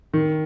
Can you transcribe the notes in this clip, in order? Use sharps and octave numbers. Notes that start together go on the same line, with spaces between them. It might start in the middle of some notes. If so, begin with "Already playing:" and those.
D#3